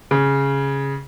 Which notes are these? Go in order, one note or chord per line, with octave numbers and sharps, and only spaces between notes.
C#3